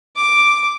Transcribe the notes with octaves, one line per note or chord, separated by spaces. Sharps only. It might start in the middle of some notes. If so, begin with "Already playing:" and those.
D6